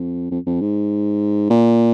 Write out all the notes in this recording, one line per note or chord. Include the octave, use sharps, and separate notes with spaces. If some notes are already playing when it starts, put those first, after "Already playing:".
Already playing: F2
F2
F2
G#2
A#2